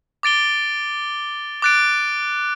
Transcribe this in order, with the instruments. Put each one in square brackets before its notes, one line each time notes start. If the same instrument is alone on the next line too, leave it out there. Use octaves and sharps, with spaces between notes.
[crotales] D6 A6 D7 G7
D6 F#6 A6 D7